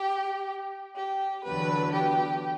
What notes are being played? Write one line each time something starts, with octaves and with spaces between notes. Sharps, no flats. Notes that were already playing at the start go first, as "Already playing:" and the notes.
Already playing: G4
G4
E2 D3 F#3 B3 B4
G4